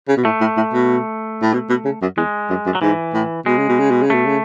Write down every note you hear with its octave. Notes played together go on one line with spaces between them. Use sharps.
C#3
B2
A2 A3
A2
A2
B2
A2
B2
B2
C#3
F#2
E2 G#3
F#2
F#2
F#3
G#2 E3
A2
B2 G#3
C#3
B2
C#3
B2
C#3
B2 A3
C#3